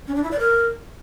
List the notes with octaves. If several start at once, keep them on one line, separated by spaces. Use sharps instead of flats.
C#4
D4
E4
D5
A#4